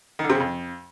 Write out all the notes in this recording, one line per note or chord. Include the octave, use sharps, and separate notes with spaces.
D#3
D3
C3
C#3
F2